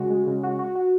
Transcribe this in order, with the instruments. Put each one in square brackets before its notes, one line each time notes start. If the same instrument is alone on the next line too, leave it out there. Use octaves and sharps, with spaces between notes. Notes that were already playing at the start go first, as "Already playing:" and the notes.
Already playing: [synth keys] C#3 G#3 F#4
G#3
C#3
F#4
F#4
F#4